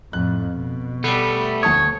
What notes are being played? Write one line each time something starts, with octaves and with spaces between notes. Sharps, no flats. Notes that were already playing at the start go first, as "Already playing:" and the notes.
F2 A2 F#6
B2
G3 A3 B3 C7
D2 C#5 A5 D#6